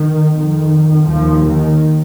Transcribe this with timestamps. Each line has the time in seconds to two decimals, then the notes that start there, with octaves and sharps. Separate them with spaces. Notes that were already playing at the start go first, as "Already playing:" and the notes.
Already playing: D#3
0.34 F2 D#3
1.07 D#2 F3
1.45 D#3